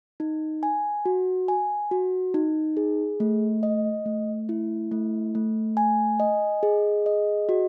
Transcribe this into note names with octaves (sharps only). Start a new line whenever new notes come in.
D#4
G#5
F#4
G#5
F#4
D#4
G#4
A3
D#5
A3
E4
A3
A3
G#5
D#5
G#4
D#5
F#4